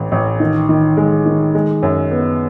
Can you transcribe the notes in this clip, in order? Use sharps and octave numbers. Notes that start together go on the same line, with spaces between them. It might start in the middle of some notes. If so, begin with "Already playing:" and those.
Already playing: A1 E3
A1
D#3
D#3
G#3
D#3
G#3
F#2
B3